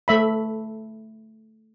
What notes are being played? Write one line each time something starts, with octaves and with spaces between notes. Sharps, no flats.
A3 E5 B5